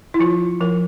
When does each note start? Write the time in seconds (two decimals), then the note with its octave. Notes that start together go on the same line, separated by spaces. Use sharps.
0.14 E4
0.19 F3 F4
0.61 F3 A#4